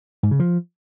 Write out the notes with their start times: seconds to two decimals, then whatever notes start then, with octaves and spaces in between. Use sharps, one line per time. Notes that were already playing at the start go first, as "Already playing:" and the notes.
0.23 G#2
0.31 C#3
0.40 F3